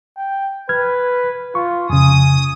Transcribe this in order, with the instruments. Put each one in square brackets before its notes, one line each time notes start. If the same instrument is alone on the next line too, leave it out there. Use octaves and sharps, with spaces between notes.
[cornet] G5
[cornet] B4 [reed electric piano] F6 G#6
[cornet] F4 [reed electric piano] C#6
[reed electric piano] F2 C#3 [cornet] G#5 [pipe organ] D#6